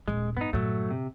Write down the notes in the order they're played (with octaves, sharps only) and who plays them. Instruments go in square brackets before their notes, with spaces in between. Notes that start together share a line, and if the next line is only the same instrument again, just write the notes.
[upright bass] D#1 A#2 [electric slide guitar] G#3
[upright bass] G2 [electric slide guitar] B3 D#4
[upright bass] G2 A#2 [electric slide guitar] F#3 A3
[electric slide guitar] C3